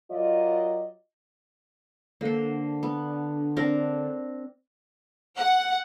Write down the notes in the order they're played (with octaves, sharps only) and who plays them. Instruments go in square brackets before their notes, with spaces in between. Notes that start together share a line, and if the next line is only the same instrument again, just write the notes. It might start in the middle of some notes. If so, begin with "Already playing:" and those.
[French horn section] F#3 F4 A#4 D5 D#5
[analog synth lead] D3 [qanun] A#3 C5
[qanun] B3
C4 D4 A#4
[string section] F#5